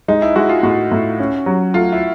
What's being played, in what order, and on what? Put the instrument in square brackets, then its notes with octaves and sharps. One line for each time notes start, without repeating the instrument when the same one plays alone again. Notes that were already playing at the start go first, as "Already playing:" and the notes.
[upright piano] G#3 [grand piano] D#4
[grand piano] E4
[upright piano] G#3 [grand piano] F#4
[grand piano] F4
[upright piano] A2 [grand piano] F#4
[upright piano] A2
C#4
F#3
[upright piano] A3 [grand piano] F4
[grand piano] E4